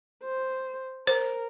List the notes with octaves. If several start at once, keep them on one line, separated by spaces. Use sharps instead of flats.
C5
A#4 C5